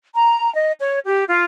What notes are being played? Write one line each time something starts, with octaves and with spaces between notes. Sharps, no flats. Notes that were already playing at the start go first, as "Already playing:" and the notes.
A#5
D#5
C#5
G4
F4